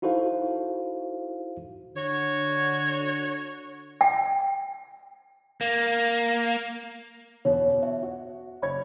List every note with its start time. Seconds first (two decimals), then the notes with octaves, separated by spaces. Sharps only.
0.02 D#4 E4 F#4 A4 C5 F5
1.96 D3 F#4 C#5
4.01 G5
5.61 A#3
7.45 E2 B2 C#5
7.83 C#5 E5
8.03 F#4
8.62 F#1 C#5 B5 G#6